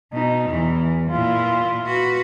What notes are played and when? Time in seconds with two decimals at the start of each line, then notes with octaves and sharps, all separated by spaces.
0.12 B2 D#4
0.50 E2 E3
1.10 A#2 E4 F4
1.86 F#4 B4